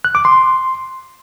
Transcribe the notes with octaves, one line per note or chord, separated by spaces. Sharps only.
F#6
D6
C6